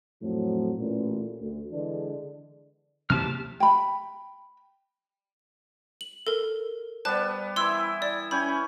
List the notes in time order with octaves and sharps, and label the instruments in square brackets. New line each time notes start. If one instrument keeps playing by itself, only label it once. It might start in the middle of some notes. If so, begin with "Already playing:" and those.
[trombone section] F2 A2 F3 F#3
A1 A#2
D2
D3 E3 G#3 D4
[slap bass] C3 E3 A#3 [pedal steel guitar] G4 A5 F6
[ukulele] G5 B5
[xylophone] F#7
A4 A#4
[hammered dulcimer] G3 B3 [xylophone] C5 A5 F#6
[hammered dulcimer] E3 E4 [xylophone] C6 E6
[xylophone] D5
[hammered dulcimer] C#4 G5 G#5 [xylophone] B5